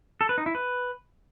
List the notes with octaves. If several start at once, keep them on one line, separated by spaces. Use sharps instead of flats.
A4
B4
D#4
E4
B4